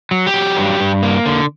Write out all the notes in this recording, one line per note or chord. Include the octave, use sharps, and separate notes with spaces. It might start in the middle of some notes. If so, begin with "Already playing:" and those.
F#3
G4
F#3
G2
G2
A#3
D3